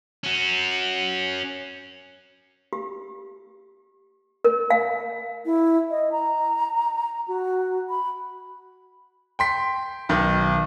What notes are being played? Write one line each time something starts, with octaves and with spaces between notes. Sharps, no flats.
C#4 F#4
G4
A#4
F5
E4
D#5
A#5
F#4
B5
G5 C6 B6
B1 D#3